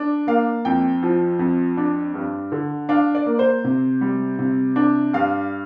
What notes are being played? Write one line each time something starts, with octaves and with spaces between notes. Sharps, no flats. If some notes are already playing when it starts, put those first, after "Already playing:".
Already playing: D4
A#3 F5
F2 G5
F3
F2
D4
G2
D3
D4 F5
D5
A#3
C5
C3
G3
C3
D4
G2 F5